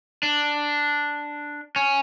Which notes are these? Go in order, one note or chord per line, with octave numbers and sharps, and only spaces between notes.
D4
C#4